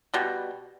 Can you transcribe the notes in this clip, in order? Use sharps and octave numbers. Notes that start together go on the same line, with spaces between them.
B2 G3